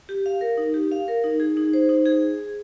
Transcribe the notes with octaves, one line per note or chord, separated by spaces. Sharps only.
G4
F5
A#4
D#4
G4
F5
A#4
D#4
G#4
D#4
C5
D#4
G#4